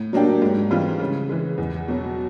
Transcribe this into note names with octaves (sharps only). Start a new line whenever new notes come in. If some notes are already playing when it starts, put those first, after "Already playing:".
Already playing: A2
F#3 A#3 D4 G4
G#2
E3 G3 C4 F4
C#3
E3 G#3
E2
B2 F#3